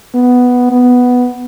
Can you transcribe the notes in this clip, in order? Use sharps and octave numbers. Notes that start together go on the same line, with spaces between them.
B3
B3